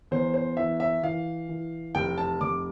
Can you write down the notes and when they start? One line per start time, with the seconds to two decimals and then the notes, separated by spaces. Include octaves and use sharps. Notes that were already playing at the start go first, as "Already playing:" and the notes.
0.11 E2 C5
0.34 C5
0.57 E3 E5
0.80 E5
1.03 E3 F5
1.49 E3
1.95 F1 G5
2.18 A5
2.40 F1 D6